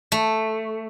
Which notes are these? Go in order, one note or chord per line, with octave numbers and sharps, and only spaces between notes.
A3